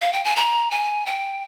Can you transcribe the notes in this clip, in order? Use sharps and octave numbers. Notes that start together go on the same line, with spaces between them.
F5
G5
G#5
A#5
G#5
G5